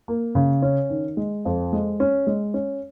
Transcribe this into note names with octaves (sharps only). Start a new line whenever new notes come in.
A#3
C#3
C#4
D#3
G#3
F2
G#3
C#4
G#3
C#4